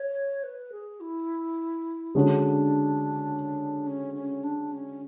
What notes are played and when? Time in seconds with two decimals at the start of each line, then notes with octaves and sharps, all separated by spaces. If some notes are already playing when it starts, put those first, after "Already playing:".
Already playing: C#5
0.43 B4
0.72 G#4
1.00 E4
2.15 D3 G#3 C#4 D4 F#4
3.86 C#4
4.14 C#4
4.43 D4
4.72 C#4